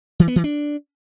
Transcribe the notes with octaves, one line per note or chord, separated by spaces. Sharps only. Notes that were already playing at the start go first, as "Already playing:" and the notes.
E3
B3
E3
D4